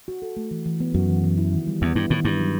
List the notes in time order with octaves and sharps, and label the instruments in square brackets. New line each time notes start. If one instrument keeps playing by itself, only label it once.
[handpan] F#4
A4
A3
E3
E3
B3
[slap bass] F#2 [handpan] F#4
[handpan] E3
E3
E4
D#3
G3
[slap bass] E2 [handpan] B3
[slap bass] G2 [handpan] E4
[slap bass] A2 [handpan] D#3
[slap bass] G2 [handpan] E4
[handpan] F#3